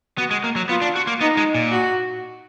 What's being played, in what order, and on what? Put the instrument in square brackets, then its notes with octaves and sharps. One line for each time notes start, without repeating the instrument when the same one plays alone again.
[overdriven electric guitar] B3 [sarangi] F#4
[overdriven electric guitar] G#3
A#3
F#3
[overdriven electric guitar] B3 [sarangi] F4
[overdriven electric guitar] D4
F#4
A#3
[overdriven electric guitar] B3 [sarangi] D#4
[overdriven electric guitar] G#3
A#2
[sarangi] F#4